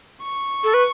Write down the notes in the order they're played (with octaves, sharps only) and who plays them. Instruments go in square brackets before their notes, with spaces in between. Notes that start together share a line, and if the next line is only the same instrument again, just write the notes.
[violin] C#6
[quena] A4
B4